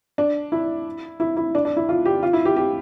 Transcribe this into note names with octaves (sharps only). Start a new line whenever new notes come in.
D4
E4
E4
E4
D4
D4
E4
F4
G4
F4
E4
G4
G4